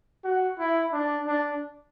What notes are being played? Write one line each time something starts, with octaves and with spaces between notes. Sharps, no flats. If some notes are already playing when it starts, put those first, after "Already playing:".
F#4
E4
D4
D4